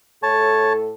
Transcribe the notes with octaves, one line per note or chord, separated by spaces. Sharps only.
A2 A4 C#5 A5